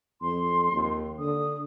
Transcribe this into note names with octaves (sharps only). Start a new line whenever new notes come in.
F2 C6
D#2
D3 D#6